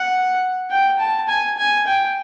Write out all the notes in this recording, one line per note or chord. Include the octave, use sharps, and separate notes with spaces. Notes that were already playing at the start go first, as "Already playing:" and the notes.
Already playing: F#5
G5
A5
G#5
G#5
G5